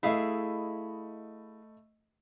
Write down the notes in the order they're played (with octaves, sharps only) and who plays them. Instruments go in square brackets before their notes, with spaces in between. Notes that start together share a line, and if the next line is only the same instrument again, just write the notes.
[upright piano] A3 D#5 B5 [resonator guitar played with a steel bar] E4 G#4 F5